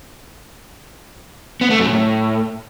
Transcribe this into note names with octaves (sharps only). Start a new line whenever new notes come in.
B3
A3
F#2
A2